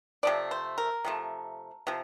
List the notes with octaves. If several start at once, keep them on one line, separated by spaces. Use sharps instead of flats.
C3 F3 A3 D5
C5
A#4
C3 F3 A3
C3 F3